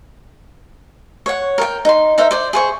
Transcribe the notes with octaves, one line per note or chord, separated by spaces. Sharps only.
C#5 F#5
A#4 G5
D#4 C6
D#4 A#4 C5 E5
C5 D5
G#4 C5 C#6